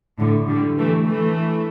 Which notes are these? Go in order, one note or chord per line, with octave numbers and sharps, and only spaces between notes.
A2 D3
D3 G3
E3 A3
E3 A3